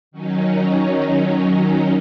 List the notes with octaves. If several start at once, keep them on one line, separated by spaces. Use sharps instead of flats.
D#3 F#3 C#4 D#4